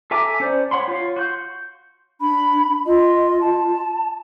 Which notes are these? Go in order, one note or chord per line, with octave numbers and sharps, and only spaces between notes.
A4 E5 G#5 A#5 D6
C#4 C5 D5
C#5 F#5 B5 C6
F4 C#5 F5
F#4 C6 G6
D4 B5
F4 D#5
A5